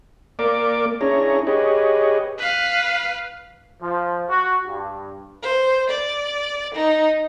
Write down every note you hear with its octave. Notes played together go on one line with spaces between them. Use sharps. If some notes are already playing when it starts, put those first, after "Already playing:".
A#3 A#4 D5 D6
C#4 D4 E4 G#4 C#5 A#5
G4 G#4 B4 C#5 D#5
B4 F5
F3
F#4
G2
C5
D5
D#4